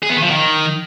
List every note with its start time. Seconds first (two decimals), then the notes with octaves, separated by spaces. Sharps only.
0.03 G#4
0.10 B3
0.16 D#3
0.23 F3
0.30 D#3